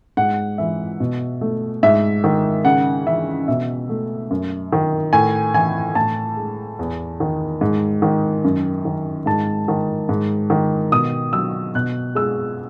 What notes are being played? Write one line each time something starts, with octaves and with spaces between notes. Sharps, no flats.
G#2 F#5
E3 E5
B2
A3
G#2 E5
D#3
C#3 F#5
E3 E5
B2 E5
A3
F#2
D#3
A2 G#5
E3 G#5
A2 A5
G#3
E2
D#3
G#2
D#3
F#2
D#3
G#2 A5
D#3
G#2
D#3
B2 D#6
F#3 E6
B2 F#6
G#3 E6